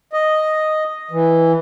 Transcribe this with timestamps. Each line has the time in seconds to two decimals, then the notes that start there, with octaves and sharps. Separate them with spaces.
0.13 D#5
1.11 E3